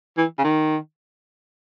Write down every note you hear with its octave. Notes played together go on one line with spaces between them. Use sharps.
E3
C#3
D#3